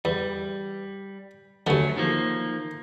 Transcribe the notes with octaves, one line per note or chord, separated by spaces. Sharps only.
E2 G3
D#2 D3 F#3 A3 C#4
D#3 F3 A#3